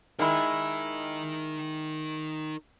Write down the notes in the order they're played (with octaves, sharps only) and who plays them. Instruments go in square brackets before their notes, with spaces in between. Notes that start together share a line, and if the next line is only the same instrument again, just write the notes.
[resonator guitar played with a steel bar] D#3 G#3 E4 [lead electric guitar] D#4 A#4